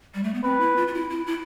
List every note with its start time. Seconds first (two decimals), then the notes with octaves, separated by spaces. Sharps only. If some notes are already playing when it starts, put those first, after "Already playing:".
0.14 G3
0.23 A3
0.34 B3
0.43 C4 B4
0.60 E4
0.77 F4
0.88 F4
0.94 E4
1.10 E4
1.27 E4